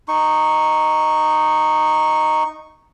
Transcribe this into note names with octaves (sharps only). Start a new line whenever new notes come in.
D#4 C#6